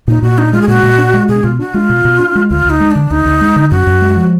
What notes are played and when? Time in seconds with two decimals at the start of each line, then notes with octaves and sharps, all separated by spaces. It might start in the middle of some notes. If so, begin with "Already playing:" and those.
0.08 A#2 D#4
0.22 A#2 F#4
0.38 D4 D#4
0.53 G#3 F4
0.62 G#4
0.68 A#2 F#4
0.83 A#2
0.98 D4
1.14 G#3
1.29 B2 G#4
1.44 B2 F4
1.59 D4 F#4
1.74 G#3 F4
1.89 B2
2.05 B2
2.19 D4
2.35 G#3
2.50 D2 F4
2.66 D2 D#4
2.80 G#3
2.91 D3 D4
3.11 D2 D#4
3.26 D2
3.41 G#3
3.56 D3
3.71 F#2 F#4
3.87 F#2
4.02 G#3
4.17 F3